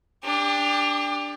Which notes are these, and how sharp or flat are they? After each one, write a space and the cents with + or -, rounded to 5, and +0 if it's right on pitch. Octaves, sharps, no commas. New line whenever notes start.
D4 +0 G4 +30